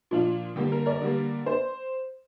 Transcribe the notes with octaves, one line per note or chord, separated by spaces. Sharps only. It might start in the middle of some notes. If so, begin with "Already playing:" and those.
A#2 F3 D4 F4
D3 G3 A#3 G4
A#4
A#4 D5
D3 G3 A#3
C5